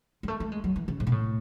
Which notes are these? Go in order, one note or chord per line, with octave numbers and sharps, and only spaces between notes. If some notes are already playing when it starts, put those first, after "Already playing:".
G#3
A3
A3
G#3
F#3
E3
C#3
G#2
B2
A2